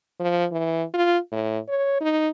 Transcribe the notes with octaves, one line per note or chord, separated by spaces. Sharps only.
F3
E3
F4
A2
C#5
D#4